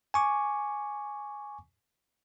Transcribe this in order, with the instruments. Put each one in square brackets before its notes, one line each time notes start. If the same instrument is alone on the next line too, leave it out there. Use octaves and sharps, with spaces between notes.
[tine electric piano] G#5 C#6 D6